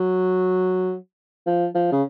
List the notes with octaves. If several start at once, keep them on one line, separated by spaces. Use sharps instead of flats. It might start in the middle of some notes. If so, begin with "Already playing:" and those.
Already playing: F#3
F3
F3
C#3